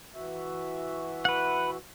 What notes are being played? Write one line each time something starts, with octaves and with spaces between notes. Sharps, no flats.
E3 F#4 E5
B4 F#5